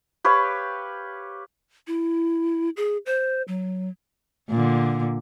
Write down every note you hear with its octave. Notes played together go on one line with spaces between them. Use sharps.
G4 B4 C#5 F5
E4
G#4
C5
F#3
A#2 D3